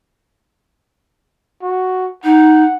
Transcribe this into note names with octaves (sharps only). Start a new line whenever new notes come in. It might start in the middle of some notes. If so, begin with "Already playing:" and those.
F#4
D#4 F#5